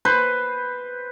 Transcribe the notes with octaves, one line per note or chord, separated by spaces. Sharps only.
B4 C5